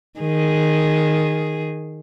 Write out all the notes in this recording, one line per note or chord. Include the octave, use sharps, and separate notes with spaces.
D#3 G#4